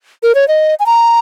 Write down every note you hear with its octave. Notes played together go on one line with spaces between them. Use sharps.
A#4
C#5
D#5
G#5
A#5